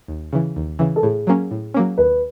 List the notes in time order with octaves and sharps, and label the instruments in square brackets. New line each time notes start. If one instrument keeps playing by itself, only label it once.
[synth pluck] D#2
C#3 E3
D#2
C#3 E3
[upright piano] A4
[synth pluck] A2 [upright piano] G#4
[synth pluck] F#3 A#3 C#4
A2
F#3 A#3 C#4
[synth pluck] D#2 [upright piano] B4